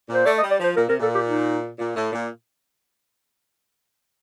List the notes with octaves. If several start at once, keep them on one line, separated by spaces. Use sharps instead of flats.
A#2
C5
A3 D5
D#5
G3
D5
F3 C5
A#2 A#4
C3 A#4
A#2 A4
G4
D#4
A#2
A2
A#2